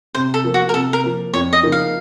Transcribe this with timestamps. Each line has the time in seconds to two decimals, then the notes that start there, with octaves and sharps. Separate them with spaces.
0.15 C3 C5
0.34 A4
0.44 F3 A#3
0.54 F#4
0.69 A#4
0.74 C3 A4
0.93 A#4
1.04 F3 A#3
1.34 F2 C#5
1.53 D#5
1.63 C#3 F3 A#3 D#4
1.72 F5